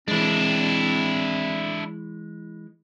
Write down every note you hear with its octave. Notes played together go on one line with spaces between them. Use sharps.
E3 G#3 C4 D4 E4